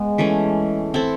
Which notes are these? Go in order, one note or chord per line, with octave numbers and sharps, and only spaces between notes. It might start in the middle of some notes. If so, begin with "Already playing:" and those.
Already playing: G#3 B3
E3 A3 C#4
C4 E4 A4